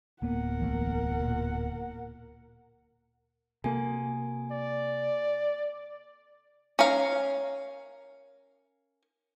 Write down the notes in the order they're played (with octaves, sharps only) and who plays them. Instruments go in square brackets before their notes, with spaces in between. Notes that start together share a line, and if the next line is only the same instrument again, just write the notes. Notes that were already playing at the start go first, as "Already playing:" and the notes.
[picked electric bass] D1 A#3 B3 [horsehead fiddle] A#4 F#5
[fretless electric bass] B1 E3 A3
A#2
[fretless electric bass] C3 A#3 [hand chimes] F#4 A4 G#5
[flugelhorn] D5
[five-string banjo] C#4 A#4 F5